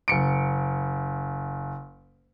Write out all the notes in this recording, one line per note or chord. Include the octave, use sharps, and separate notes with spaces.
F#1 C#7 D7